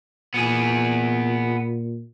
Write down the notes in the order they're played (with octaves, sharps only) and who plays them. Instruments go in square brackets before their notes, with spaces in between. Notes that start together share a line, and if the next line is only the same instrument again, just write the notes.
[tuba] A#2 [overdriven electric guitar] B3 G#4